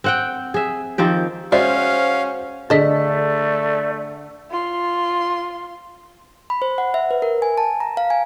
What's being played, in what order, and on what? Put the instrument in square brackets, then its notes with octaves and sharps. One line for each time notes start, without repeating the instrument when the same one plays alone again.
[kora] C4 F#5 G5
G#4 E5
D#3 F3 C4 G4
[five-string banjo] G#3 D5 E5 [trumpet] C#4 [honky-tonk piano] F#4 C5 [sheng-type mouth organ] F5
[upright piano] D3 G#4 B6 [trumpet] A3 [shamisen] A4 D#5 [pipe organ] D5
[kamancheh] F4 C6
[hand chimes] B5
C5
F#5
E5
B4
A#4
G#5
A5
A#5
F5
G#5